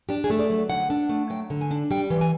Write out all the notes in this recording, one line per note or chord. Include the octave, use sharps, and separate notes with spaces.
D4 G4
G#4
A3
D5
F#3
D3 F#5
D4
A3
F#3 G5
D3
G#5
D4
G3 G5
E3
G#5